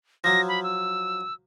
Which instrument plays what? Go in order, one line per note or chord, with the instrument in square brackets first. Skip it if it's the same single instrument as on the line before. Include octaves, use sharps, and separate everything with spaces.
[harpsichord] F3 F#3 [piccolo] A#6
[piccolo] B5
E6